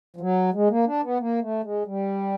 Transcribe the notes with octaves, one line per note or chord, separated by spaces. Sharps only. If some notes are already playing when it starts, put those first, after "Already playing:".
F3
F#3
G#3
A#3
D4
B3
A#3
A3
G#3
G3